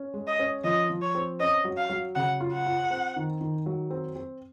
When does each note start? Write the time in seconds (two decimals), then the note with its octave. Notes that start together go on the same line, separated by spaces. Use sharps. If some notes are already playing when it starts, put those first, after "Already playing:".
Already playing: C#4
0.14 G#3
0.27 D#5
0.39 C#4
0.64 F3 D#5
0.90 F3
1.02 C#5
1.15 C4
1.40 C#4 D#5
1.65 F#3
1.77 F5
1.90 F#3
2.15 C#3 F#5
2.40 F4
2.53 F#5
2.66 F4
2.90 C4
3.16 D#3
3.41 D#3
3.66 F#3
3.90 C4
4.16 C4